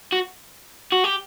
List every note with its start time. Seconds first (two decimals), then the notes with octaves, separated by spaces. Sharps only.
0.12 F#4
0.92 F#4
1.04 G4